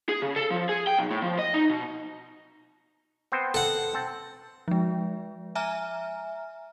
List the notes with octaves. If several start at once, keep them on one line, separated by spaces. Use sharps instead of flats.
G#4
C#3
A4
F3
G#4
G5
B1
A2
F3
D#5
D#4
B2
B3 C4 C5
A4 F#5
C4 A5
F3 G#3
E5 G#5 A#5 F6